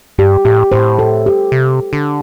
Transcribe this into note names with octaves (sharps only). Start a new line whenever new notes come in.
G2 G4
A2 G4
A2 C5
A4
G4
C3
D3